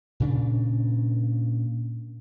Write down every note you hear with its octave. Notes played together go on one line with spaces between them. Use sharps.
A#2 C#3 D4